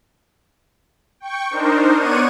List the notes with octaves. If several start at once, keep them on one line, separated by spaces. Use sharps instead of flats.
G5 C#6
D4 D#4 A#4 C5
B3 C#5 D5 F#5 C#6 D#7